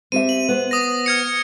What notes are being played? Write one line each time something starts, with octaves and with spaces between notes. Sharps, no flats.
C4 G4 E5 D#7
F#7
B3 C5
D#6 A#6
F6 G#6 C#7